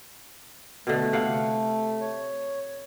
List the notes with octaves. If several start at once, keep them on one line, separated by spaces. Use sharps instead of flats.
B2 D3 A3
C3 F5 F#5
C#5